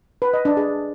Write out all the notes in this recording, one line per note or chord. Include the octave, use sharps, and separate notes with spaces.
B4
D#5
D4
G#4